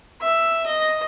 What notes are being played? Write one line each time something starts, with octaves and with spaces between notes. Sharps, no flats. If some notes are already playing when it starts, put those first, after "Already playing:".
E5
D#5